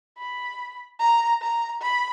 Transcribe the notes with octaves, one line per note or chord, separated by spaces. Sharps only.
B5
A#5
A#5
B5